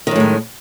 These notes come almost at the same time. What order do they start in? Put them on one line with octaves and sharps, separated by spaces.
D#3 F#2 A2 G#3